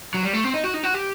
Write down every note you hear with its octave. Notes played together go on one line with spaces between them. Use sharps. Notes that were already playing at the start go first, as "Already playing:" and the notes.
F#3
G3
A3
C4
D#4
F#4
D#4
F#4
G4